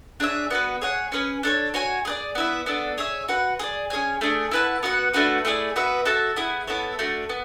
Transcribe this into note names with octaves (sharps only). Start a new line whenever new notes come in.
D4 G#4 C#5 E5
B3 F#4 B4
G#4 C#5 F#5
C#4 G#4 B4
D4 A4 C#5
F#4 C#5 G#5
G#4 B4 D5
B3 E4 B4 E5
B3 D4 A4
G#4 C#5 E5
F#4 B4 F#5
G#4 B4 D5
C#4 G#4 C#5 G#5
A3 D4 G#4
E4 B4 F#5 A5
B3 F#4 B4 F#5
A3 D4 F#4 B4
A3 E4 G#4 D5
B3 F#4 B4 E5
F#4 A4 E5 A5
B3 E4 G#4
B3 E4 A4 C#5
A3 D4 F#4
B3